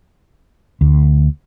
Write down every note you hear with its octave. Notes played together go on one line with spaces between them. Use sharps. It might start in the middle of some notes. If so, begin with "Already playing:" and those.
D2